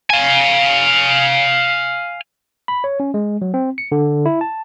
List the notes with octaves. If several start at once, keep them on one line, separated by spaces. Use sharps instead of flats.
F5 G#5
B5
C#5
C#4
G#3
F#3
C4
C#7
D3
E4
A5